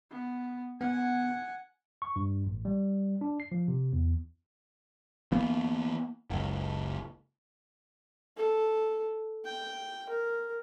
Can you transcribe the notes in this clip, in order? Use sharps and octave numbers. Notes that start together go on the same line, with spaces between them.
B3
B3 F#5 G#5
C#6
G2
A1
G3
D4
C7
F3
C3
E2
E3 A#3 B3
F#1 C#2
A4
G5
A#4